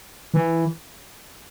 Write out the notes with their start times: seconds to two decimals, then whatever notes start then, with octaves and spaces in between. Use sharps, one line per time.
0.34 E3